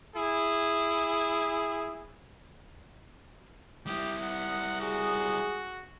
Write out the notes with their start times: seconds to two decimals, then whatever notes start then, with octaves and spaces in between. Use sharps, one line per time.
0.15 E4 G#4
3.87 G3 E4 G4 D#6
4.23 F#5
4.81 F#4 G#4